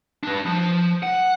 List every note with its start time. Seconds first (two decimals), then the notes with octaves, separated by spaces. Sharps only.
0.24 D4 B4
0.46 F3
1.03 F#5